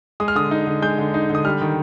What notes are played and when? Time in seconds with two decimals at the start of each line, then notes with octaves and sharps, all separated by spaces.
0.20 G#3 D#6
0.28 F6
0.35 D3 D#6
0.51 D#4
0.67 D3
0.82 G#3 G6
0.98 D3
1.14 D#4
1.30 D3
1.35 D#6
1.45 G3 F6
1.61 D#3